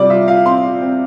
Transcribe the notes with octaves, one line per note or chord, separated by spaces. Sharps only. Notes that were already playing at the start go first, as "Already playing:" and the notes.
Already playing: C3 G3 F4 D5
F4 E5
F4 F5
C4 C6
F4
C4